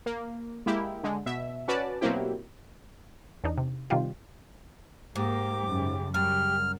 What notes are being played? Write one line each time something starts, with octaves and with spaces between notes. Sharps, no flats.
A#3
G#3 A#3 E4 G4
D3 G#3
B2 E5
C#4 F#4 B4 D5 A5
B2 F#3 A#3 C4 E4 G4
E2 D4 D#4
C3
C3 D#3 G3 F4 G4
G#2 A#3 G4 D6
F#2 C#3
F#2 C#3 G3 G4 F6